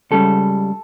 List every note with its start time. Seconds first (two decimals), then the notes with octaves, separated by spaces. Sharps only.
0.11 C#2 C#3 G3 A4